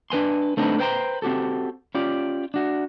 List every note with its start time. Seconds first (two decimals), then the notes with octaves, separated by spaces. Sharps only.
0.10 D4 B4 G#5 C6
0.57 A3 C4 D4 D#4 F#4 B4
0.78 B4 C5 G5 G#5 A#5 C6
1.22 C4 F#4 G4 A4
1.95 C#4 F4 G4 D5
2.54 D4 F#4